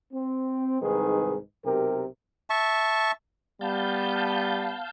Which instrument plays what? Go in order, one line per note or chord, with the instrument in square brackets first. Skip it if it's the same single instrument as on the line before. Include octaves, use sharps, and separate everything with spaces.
[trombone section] C4
C2 G#2 D#3 G#4 B4
B1 C3 G4 A#4
[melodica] E5 A5 C#6
[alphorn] G3 [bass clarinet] B3 [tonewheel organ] F5 A5 G6